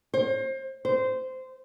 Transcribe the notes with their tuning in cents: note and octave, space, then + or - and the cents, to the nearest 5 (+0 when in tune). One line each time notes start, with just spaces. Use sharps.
C5 +30
C5 -15